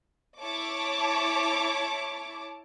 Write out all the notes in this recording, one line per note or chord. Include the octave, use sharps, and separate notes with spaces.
E4 C#5 A5 D6